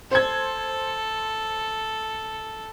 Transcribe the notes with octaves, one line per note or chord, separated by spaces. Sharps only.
A4 C5 G#6